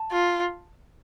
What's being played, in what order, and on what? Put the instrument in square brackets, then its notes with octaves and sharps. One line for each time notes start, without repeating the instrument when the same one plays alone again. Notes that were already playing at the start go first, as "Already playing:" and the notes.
Already playing: [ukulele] A5
[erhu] F4